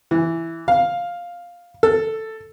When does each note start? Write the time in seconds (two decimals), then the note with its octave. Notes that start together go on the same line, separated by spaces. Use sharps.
0.11 E3
0.68 F5
1.83 A4